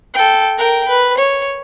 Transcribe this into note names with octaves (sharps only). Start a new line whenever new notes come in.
A4 G5
A#4 G5
B4
C#5